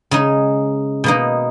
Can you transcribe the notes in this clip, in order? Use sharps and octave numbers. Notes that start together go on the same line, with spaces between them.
C#3 G#3 D#4
B2 A#3 D#4